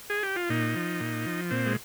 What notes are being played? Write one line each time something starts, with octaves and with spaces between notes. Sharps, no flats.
G#4
G4
F4
A#2 D#4
F3
A#2
F3
A#2 C4
G#3